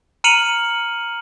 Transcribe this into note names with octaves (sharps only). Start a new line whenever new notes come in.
A#5 F6 C#7 D#7 F7 F#7